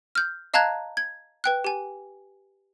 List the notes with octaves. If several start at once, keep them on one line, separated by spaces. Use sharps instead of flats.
F6 G6
D#5 F5 A5 A#5 F#6 G#6
G#6
B4 G5 F#6
G4 G#5